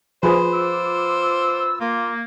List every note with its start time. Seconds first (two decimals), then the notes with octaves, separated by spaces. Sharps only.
0.23 F3 G#4 B4 C5
0.53 F4 D6 E6
1.80 A#3 F4